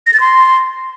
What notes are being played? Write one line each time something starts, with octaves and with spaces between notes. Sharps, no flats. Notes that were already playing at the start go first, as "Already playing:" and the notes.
A#6
A6
C6